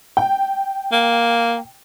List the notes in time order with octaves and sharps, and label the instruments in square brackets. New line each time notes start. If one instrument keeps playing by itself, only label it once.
[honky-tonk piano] G5
[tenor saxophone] A#3